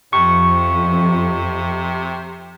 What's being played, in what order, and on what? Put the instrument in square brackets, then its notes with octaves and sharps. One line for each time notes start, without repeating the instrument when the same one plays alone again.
[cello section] F2 [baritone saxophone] C3 [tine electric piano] C#6